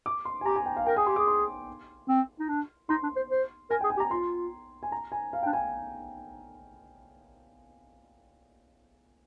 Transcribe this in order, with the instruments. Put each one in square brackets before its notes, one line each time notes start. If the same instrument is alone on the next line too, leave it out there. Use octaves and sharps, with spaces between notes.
[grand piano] D6
C6
G#5
[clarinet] G4 [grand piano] A#5
[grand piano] G#5
G5
F5
[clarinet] A#4 [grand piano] G5
[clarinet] G#4 [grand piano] G#5
[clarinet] G4 [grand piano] C6
[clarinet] G#4 [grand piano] D6
[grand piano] C6
[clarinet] C4
D#4
D4
[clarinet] D#4 [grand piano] C6
[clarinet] D4
C5
C5
[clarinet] A#4 [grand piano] G#5
[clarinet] G#4 [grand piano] G5
[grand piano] G#5
[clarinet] G4
[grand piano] A#5
[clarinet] F4 [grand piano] C6
[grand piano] G#5
A#5
G#5
F5
[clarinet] D4 [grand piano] G5
[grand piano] G#5